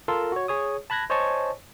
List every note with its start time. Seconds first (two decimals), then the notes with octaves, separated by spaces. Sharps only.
0.08 F4 A4 A#4 A5 C6 E6
0.32 F#4 C#5
0.48 G#4 C#5 D#6
0.90 A5 B5 F#6 G#6 A#6
1.10 C5 C#5 D#5 G#5 A5 C#6